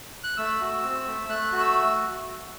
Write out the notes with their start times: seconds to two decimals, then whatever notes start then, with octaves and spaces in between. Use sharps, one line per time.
0.24 F#6
0.37 A3 E6
0.61 F#4
0.84 C4
1.07 A3
1.29 A3 F#6
1.52 F#4
1.60 E6